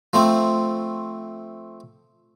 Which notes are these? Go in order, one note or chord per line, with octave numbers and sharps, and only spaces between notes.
F3 A3 C4